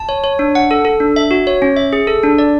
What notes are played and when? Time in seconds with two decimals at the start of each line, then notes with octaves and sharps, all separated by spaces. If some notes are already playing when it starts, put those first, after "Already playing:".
Already playing: A5
0.09 C#5
0.24 C#5
0.39 D4
0.55 F#5
0.71 A4
0.85 A4
1.00 D4
1.16 E5
1.31 F#4
1.47 C#5
1.62 C#4
1.77 E5
1.93 G#4
2.07 A4
2.23 D4
2.38 D5